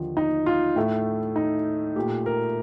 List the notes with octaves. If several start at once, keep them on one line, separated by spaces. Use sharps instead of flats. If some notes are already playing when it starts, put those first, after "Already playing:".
Already playing: D#2 D3 F3
D#4
F4
A2 A3
D#4
A#2 A3 G4
A#4